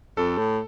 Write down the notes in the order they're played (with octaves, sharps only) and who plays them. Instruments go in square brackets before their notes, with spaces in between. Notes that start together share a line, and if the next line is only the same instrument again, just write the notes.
[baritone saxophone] F2 [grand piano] A4
[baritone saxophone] A2